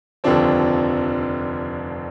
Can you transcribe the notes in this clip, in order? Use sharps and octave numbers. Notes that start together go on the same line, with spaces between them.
F1 D#2 D3 F3 C4 D4